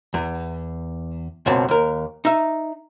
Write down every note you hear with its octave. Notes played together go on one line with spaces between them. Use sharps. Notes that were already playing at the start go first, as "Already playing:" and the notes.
E2
C#2 F#2 B2 C4 A5
D#2 A#4
D#4 E5